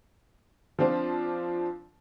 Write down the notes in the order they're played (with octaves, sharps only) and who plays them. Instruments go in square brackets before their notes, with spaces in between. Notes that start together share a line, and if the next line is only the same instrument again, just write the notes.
[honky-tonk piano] F3 C4 D4 F4